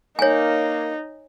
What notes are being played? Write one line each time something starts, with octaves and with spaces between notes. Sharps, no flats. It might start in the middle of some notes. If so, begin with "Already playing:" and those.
A#3 D#4 C#5 G#5